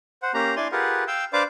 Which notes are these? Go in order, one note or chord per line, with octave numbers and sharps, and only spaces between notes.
C5 F#5
A#3 C#4 G4 A#5
D4 E4 D5 G#5 C6
F4 G4 G#4 A#4 B4 F#5
F5 G5 E6 G6
D4 B4 C5 D5 F5 D6